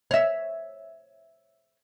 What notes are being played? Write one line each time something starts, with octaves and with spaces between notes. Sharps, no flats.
C#5 E5